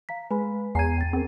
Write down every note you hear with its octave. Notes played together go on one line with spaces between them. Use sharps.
F5 A#5 B6
G#3 B4 B5
E2 G#5 A#5 G#6 C7 D#7
G5 A6
C4 G#4 A#4